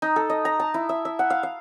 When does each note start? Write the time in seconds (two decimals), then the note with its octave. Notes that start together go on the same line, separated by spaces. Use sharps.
0.02 D#4
0.16 A4
0.30 D#5
0.45 A#5
0.60 A5
0.74 E4
0.89 E5
1.05 E5
1.19 F#5
1.30 F5
1.43 F5